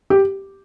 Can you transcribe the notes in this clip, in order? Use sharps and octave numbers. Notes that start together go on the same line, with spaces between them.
G4